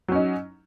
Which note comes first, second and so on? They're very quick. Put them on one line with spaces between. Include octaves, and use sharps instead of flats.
F#3 C#4 D#4